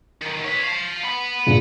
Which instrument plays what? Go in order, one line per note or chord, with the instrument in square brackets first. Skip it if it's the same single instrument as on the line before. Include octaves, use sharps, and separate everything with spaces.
[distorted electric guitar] D#3 F#3
B4 C#5
F5 A5
F#5 B5
[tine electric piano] G2 A#2 C#3